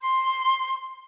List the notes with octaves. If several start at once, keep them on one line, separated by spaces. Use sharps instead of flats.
C6